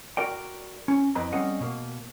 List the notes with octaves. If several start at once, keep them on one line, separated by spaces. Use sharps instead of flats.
F#4 A#4 D5 G5
C#4
F2 E3 C4 B4 D#5 A#5
G3 C4 C#4 G#4 D#5 F#5
B2 A#3